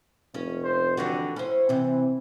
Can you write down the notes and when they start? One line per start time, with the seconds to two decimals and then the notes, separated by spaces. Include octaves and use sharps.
0.34 F1 C#4
0.64 C5
0.97 D3 E3 G3 F#4
1.36 C#4 E4 C5
1.69 C3 E3 C4